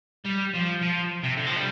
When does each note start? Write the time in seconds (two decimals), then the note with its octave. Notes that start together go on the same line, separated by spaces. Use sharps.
0.25 G3
0.54 F3
0.81 F3
1.24 C3
1.37 D3
1.47 F3
1.56 G3